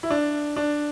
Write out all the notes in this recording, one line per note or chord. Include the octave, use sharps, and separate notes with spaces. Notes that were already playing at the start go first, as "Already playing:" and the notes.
E4
D4
D4